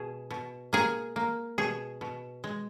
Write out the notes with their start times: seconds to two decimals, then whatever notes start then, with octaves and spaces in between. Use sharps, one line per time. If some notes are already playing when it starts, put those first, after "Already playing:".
Already playing: B2 G#4
0.30 B2
0.73 A#3 G#4
1.16 A#3
1.58 B2 G#4
2.01 B2
2.44 G#3